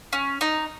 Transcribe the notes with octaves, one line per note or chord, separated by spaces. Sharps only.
C#4
D#4